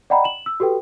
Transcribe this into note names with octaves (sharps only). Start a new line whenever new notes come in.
D5 D#5 F#5 G5 A#5 B5
E7 F#7
E6
F#4 G4 A4 B4 G5